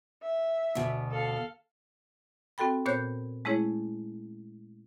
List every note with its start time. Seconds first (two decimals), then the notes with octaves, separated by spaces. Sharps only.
0.22 E5
0.75 D2 B2
1.11 A4 F5
2.58 C4 F#4 A4 G5 B5
2.85 A#2 B3 C5 C#5 F#6 G6
3.45 G#3 A3 C#4 E4 G#4 C#5